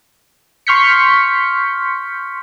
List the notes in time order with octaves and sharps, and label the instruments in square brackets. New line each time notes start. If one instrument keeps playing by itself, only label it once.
[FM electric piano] C6 C#6 F6 G6 B6 C#7